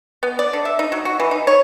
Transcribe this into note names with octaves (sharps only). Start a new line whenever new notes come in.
B3
D5
D3
E5
D#4
F#3
F#4
E3
D#4
C#5